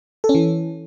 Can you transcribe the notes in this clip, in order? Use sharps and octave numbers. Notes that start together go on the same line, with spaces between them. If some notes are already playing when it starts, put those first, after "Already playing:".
A4
C#4
E3